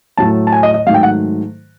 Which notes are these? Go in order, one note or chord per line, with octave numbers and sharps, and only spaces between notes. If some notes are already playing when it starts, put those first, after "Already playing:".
A2 F#3 A3 A5
A5
G#5
D#5
D#5
G#2 D#3 F#3 A3 F5
G5
F#5